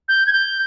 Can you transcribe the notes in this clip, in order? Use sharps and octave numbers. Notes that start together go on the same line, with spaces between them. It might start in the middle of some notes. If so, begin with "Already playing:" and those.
G6
G#6
G6